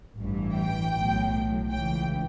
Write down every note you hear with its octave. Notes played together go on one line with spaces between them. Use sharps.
A1 G2 E3
G5
B1 A2 F#3
C#2 C#3 E3 G5